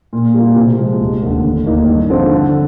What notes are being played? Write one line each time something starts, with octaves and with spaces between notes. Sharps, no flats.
A#2
G3 A#3 F4
C3
F3 G#3
F1
D#2 D3
F1
D#2 D#3 A#3 D#4
G2
D3 F3 C4 F4
D3